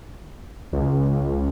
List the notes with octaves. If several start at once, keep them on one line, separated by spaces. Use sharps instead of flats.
C#2